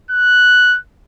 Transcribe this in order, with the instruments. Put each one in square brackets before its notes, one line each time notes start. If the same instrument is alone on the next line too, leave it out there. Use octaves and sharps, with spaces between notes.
[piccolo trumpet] F#6